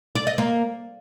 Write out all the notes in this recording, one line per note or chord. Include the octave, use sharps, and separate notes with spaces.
D5
D#5
A#3